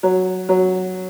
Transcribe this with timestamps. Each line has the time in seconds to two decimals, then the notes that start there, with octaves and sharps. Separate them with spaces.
0.03 F#3
0.49 F#3